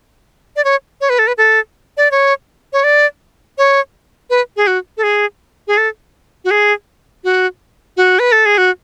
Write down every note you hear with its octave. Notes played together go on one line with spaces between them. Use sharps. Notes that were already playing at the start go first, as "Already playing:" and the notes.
D5
C#5
C#5
B4
A4
B4
A4
D5
C#5
C#5
D5
C#5
B4
G#4
F#4
A4
G#4
G#4
A4
F#4
G#4
F#4
F#4
B4
A4
G#4
F#4